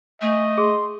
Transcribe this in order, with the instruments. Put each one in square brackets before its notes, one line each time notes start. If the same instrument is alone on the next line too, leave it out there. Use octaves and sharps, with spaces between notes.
[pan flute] A3 [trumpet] D#5 [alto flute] G#5
[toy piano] G#4 [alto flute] C6